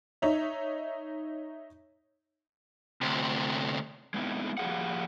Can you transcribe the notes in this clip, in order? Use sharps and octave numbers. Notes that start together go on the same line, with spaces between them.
D#4 C#5 E5
D2 C3
G#3 B3 C4 D#4 E4
F3 A#3 G4 G#4 F5 F#5